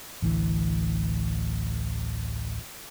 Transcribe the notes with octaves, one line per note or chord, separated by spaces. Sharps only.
A1 D2 E3